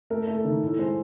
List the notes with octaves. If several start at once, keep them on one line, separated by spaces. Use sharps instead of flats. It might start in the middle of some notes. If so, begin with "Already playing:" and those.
A3 A#4
A3
A4
D#3
A2 A4
G#3 C5